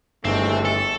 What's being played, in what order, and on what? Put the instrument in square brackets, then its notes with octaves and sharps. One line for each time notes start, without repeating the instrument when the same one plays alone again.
[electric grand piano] G1 [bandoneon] D#2 E3 G#3 [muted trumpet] A3 [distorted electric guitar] C4
[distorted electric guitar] A4